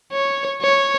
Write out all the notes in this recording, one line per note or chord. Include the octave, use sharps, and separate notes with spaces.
C#5
C#5